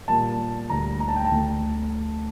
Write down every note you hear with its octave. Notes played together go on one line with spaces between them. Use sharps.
A#2 G3 A#3 A5
D2 D3 G3 A#3 A#5
A#5
A5
G5
A5
D2 D3 A3